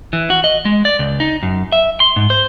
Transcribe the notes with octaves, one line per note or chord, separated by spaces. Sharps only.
E3
F#4
D#5
G#3
D5
C#2
D#4
F#2
E5
C6
G#2
C5